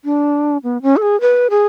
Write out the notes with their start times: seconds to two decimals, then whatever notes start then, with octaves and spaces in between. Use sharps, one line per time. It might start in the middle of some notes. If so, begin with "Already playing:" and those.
0.05 D4
0.63 B3
0.82 C#4
0.97 A4
1.02 G#4
1.21 B4
1.50 G#4